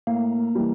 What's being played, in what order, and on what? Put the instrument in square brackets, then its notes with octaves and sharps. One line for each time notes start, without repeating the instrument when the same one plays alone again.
[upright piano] A2 [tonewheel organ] A#3
[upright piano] E3 G3